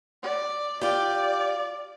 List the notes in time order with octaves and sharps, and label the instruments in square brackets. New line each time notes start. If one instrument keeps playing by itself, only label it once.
[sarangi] D5
[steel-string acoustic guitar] F4 G4 [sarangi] D5